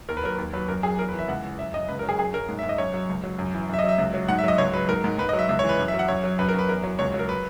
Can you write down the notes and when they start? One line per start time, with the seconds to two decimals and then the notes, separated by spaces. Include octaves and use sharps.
0.09 D#2 A#4
0.17 B4
0.24 F#3 A#4
0.38 D#2
0.53 F#3 B4
0.68 F#2 A#4
0.83 F#3 G#4
0.98 E2 A#4
1.09 B4
1.14 E3
1.19 E5
1.28 C#2 F#5
1.44 E3
1.58 F#2 E5
1.74 F#2 D#5
1.88 C#2 B4
1.99 A#4
2.03 F#3
2.09 G#4
2.19 F#2 G#4
2.34 F#2 A#4
2.49 G#2
2.59 E5
2.63 G#2
2.69 D#5
2.78 F#2 C#5
2.94 F#3
3.09 C#2
3.24 F#3
3.39 F#2
3.54 E3
3.69 F#2 E5
3.79 D#5
3.84 F#3
3.89 E5
3.98 C#2
4.14 F#3
4.28 G#2 F#5
4.39 E5
4.44 F#3 D#5
4.58 C#2 C#5
4.73 F#3 B4
4.89 G#2 A#4
5.04 G#2
5.18 G#2 B4
5.29 D#5
5.33 F#3
5.39 E5
5.49 C#2 E5
5.59 C#5
5.64 E3
5.69 B4
5.79 F#2
5.88 E5
5.94 F#3
5.99 F#5
6.08 F#2 C#5
6.24 F#3
6.39 F#2 B4
6.49 A#4
6.54 F#2 B4
6.69 E2 A#4
6.84 F#3
6.99 C#2 C#5
7.14 F#3
7.19 A#4
7.29 B4